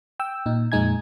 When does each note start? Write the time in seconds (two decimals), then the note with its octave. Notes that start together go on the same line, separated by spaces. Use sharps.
0.20 G5 E6
0.46 A#2 D#4
0.72 F2 A#2 G#3 D#4 G#5 G#6